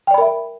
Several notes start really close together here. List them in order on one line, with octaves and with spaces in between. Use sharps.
G5 D5 B5 A#4 E5